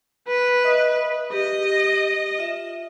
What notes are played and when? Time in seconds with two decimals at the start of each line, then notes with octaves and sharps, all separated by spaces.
0.28 B4
0.64 D#5 E5 D#6
1.32 G4 D#5
2.38 F4 E5